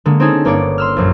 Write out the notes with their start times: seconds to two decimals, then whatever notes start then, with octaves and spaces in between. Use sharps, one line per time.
0.06 D3 G#3 A#3
0.20 C4 C#4 D#4 G#4 A4
0.45 G1 A#3 C#5 D5 D7
0.78 C6 E6 F6
0.96 A#1 F#2